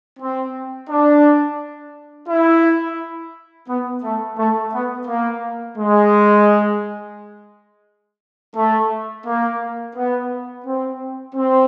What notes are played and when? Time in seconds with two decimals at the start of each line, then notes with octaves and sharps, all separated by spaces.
0.20 C4
0.90 D4
2.29 E4
3.69 B3
4.03 A3
4.38 A3
4.73 B3
5.08 A#3
5.78 G#3
8.56 A3
9.26 A#3
9.96 B3
10.65 C4
11.35 C4